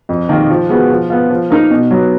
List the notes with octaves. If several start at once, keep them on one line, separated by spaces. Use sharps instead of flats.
F2
D#3 A#3
F3
G#3 B3 F#4
F3
B3 F4
F3
A#3 D#4 A#4
B2
F#3 B3